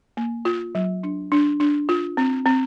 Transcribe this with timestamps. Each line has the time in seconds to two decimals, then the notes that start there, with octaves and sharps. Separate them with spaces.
0.17 A#3
0.45 F4
0.75 F#3
1.03 D4
1.32 D4
1.60 D4
1.89 F4
2.17 C4
2.46 C4